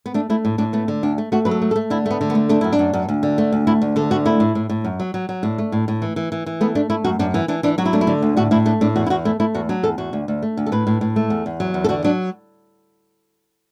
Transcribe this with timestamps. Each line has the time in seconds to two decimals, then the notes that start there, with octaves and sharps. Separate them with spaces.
0.06 B3
0.14 A3 D4
0.30 A3 E4
0.45 A2
0.58 A2 D4
0.73 A3 B3
0.88 D3
1.03 D2 D4
1.18 A3
1.32 A3 F#4
1.45 F#3 B4
1.51 A4
1.62 A3
1.71 A4
1.76 A3
1.90 D3 E4
2.06 A3 B3
2.21 D3
2.30 B3
2.35 A3
2.49 A3 D4
2.61 F#2 E4
2.72 D4
2.79 F#2
2.93 F#2
3.09 D2
3.23 D3
3.38 A3
3.52 D2
3.67 A3 E4
3.82 D2
3.96 D3 A4
4.11 D2 F#4
4.25 A3 E4
4.40 A2
4.55 A2
4.70 A2
4.85 F#2
5.00 F#3
5.14 F#3
5.29 F#3
5.43 A2 D4
5.58 A3
5.72 A2
5.88 A2
6.02 E3
6.16 E3
6.32 E3
6.46 E3
6.61 A3 B3
6.75 A3 D4
6.90 A3 E4
7.04 F#2 F#4
7.19 F#2 D4
7.34 E3 B3
7.48 E3 D4
7.63 E3 D4
7.78 F#3 F#4
7.86 E4
7.93 A3 D4
8.01 E4
8.07 D3
8.22 D2
8.37 A2 F#4
8.51 A2 E4
8.66 A3 D4
8.81 A2 D4
8.96 E2 F#4
9.06 E4
9.10 E2 F#4
9.25 A3 E4
9.40 A3 E4
9.54 E2 F#4
9.69 F#3 D4
9.83 E2 A4
9.98 E2 F#4
10.13 D2
10.28 D2
10.43 A3
10.57 D2
10.66 A4
10.72 A2 B4
10.87 A2
11.01 A2
11.16 A3
11.30 E2
11.46 E2
11.60 F#3
11.74 E2
11.84 A4
11.89 D3 F#4
12.04 F#3 D4